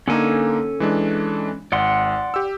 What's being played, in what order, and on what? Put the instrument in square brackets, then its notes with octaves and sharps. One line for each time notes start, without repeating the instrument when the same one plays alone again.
[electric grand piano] D3 A#3 D#4 [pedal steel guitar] C#4 A4 G#5
[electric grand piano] E3 G#3 D4
[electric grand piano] G#1 [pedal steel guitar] D5 F#5 C6
[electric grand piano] G4 E6